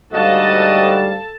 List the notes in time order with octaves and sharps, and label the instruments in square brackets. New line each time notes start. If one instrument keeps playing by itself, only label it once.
[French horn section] D2 G#2 G3 [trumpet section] F#4 D#5 [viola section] A4 A5 [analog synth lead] F5